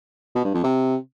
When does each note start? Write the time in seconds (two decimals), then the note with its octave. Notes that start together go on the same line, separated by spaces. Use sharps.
0.35 B2
0.45 G2
0.54 F2
0.64 C3